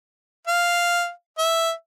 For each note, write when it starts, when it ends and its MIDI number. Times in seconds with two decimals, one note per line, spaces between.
0.47 1.10 77
1.38 1.72 76